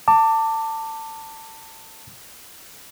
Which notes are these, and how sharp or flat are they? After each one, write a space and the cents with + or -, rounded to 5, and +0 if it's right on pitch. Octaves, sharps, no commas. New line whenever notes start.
A5 +25 D6 +0